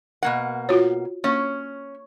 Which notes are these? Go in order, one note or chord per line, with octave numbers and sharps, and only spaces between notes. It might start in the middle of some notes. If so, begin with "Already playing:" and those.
B2 A#3 F#5
F4 F#4 C#5
A#3 C#4 C#5